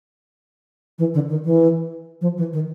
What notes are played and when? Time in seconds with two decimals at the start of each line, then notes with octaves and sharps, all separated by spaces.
0.99 E3
1.14 D3
1.29 D#3
1.45 E3
2.21 F3
2.37 E3
2.53 D#3